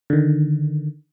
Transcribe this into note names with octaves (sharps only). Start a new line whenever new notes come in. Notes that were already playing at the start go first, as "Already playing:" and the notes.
D3 D#3